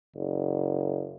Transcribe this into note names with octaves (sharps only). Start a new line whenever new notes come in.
F#1